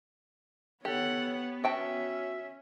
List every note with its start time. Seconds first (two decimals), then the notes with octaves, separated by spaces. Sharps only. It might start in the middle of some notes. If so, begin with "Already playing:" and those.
0.85 B3 G4 A4 C#5 F#5
1.64 C#4 F#4 E5 G5 A5